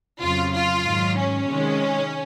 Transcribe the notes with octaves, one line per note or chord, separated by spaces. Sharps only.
F2 C#3 F#3 F4
F4
G#2 D#3 F#3
C#4
C3 D#3 G#3